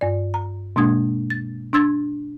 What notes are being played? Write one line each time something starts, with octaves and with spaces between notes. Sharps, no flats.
G2 D5
A#5
B2 G#3 A#3 D4 D#6 G#6
A6
D4 C6 E6 G#6 A6